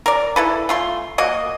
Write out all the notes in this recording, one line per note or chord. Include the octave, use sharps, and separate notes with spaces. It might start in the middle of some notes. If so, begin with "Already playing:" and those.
A#4 D5
E4 A4 B4
A3 F4 C6
A#3 F#4 D#5